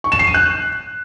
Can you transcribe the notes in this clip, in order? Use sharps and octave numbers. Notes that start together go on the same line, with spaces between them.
C#6
E7
C7
D#7
F#6